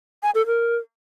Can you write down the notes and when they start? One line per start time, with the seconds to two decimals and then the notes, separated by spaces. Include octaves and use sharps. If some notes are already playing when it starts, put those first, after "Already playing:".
0.23 G#5
0.35 A4
0.47 A#4